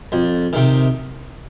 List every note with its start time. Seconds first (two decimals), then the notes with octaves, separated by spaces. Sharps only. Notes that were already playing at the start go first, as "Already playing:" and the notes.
0.12 F2
0.53 C3 D#3